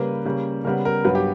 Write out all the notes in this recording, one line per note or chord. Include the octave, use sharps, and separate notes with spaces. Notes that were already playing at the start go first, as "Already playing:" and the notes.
Already playing: C#3 G3 A#3 B4
C#3 G3 A#3
C#3 G3 B3 A#4
A#4
G2 F#3 B3 B4
G4